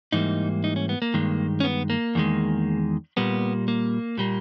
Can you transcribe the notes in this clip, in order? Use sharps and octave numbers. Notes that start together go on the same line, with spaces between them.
G#2 E3 G3 A#3 D#4
D#4
C#4
B3
A#3
G2 D#3 G#3
C#4
B3
A#3
E2 D#3 G#3
A#2 G3 A#3 B3
A#3
A#2 G3 A#3